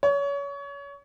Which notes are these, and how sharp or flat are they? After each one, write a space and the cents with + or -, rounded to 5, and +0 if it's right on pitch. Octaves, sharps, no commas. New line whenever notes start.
C#5 +30